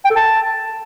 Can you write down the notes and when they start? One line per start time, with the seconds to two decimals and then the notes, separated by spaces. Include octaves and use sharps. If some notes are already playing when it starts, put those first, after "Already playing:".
0.05 G5
0.10 A4
0.16 A5